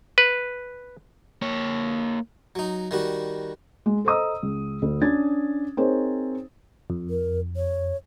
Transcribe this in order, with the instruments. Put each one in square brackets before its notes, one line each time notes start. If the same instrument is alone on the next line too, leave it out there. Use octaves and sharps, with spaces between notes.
[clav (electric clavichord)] B4
[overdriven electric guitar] A#3 C#5
[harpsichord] F#3 D#4
D#3 G3 F#4
[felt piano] G#3
A4 C5 D#5 A#5 D#6 E6
C#2
D2
C#4 D4 G#6 A6
C4 D#4 G#4 A#4 C5 C#5
[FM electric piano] F2
[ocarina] A#4
C#5